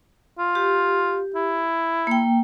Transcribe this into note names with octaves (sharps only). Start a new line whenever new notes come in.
F4
G4
E4
A#3 G5